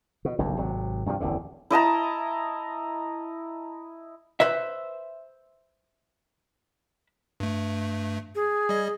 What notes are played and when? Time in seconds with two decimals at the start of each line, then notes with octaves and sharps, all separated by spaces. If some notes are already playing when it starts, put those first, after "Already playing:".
0.25 B2
0.38 F#1 B1 G2
0.57 G#1 C3 F#3
1.06 G2 C3 D#3 F3
1.20 D1 A1 E2 D3
1.70 E4 D#5 A5 A#5
4.40 B4 C5 E5
7.40 G2 A3
8.35 G#4
8.69 G3 D#5